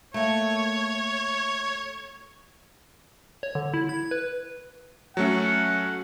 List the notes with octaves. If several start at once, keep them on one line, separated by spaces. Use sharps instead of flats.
A3 A#3 C#5
C#5
D3
E4
G#6
B4
F#3 A3 C#4 F#5